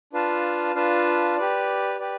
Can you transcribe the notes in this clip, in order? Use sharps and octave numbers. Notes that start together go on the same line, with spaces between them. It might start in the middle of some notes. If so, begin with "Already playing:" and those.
D4 F4 B4 F5 A5
D4 F4 B4 F5 A5
G4 B4 D5
G4 B4 D5